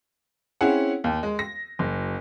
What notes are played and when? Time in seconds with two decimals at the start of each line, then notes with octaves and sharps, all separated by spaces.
0.61 C4 C#4 E4 G#4 F#5
1.04 D#2
1.23 G#3
1.39 A#6
1.79 F#1